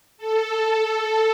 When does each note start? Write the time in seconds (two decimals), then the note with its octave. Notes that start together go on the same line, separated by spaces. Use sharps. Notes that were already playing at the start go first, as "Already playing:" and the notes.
0.18 A4
0.89 A4